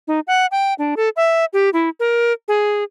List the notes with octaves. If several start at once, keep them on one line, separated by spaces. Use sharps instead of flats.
D#4
F#5
G5
D4
A4
E5
G4
E4
A#4
G#4